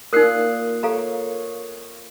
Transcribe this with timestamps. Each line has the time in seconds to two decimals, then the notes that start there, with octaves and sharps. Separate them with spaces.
0.13 A#2 D#4 A#4 D#6 F#6 C7
0.83 A4 C#5 F5 A#5